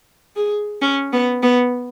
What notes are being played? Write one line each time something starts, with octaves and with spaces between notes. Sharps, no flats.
G#4
C#4
B3
B3